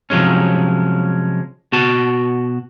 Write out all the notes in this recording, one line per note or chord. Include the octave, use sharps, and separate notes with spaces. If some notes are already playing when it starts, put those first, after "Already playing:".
C3 F3 F#3 G#3 C#4
B2 F#4 A5